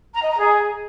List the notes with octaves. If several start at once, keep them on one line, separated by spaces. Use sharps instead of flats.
A#5
D#5
A#5
G#4